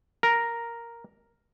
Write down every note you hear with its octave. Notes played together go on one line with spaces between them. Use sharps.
A#4